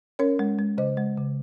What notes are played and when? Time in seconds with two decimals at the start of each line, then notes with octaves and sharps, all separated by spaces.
0.19 C#4 A#4 C#5
0.39 G#3
0.59 G#3
0.78 C#3 C5 D#5
0.97 G#3
1.17 C#3